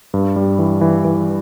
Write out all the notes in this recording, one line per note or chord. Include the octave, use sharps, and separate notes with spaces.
G2
G3
E3
E3
E3